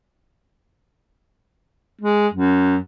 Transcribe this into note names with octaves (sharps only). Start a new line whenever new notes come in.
G#3
F#2